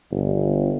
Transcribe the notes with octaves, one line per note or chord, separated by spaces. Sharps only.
G1